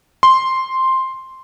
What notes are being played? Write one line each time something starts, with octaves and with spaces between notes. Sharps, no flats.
C6